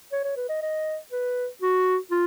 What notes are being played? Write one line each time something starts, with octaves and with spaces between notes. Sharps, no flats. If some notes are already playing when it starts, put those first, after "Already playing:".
C#5
C#5
B4
D#5
D#5
B4
F#4
F4